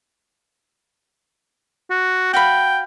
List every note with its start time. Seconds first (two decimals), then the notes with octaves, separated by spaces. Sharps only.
1.90 F#4
2.34 F#4 F5 G5 B5